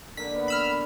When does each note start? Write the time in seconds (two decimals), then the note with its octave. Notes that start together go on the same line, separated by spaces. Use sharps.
0.17 D3 A#3 B6
0.36 B3 D5 F#5
0.48 B5 E6 F6